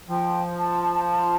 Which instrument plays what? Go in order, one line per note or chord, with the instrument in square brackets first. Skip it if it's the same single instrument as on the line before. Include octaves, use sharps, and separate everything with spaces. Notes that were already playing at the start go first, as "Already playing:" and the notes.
[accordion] F3 [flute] G5
[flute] A5